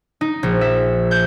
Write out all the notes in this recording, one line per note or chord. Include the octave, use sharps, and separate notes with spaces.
D#4
A#1
E5
G6